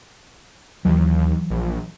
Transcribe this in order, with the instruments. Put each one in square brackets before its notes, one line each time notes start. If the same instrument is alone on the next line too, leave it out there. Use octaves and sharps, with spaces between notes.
[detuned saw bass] D#2 [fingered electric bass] E3 F#3
[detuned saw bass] A#1